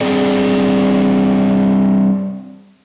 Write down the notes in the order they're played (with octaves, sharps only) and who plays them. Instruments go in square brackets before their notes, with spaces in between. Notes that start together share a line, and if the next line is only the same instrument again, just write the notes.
[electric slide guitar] G3 C4 D4 G#4 D5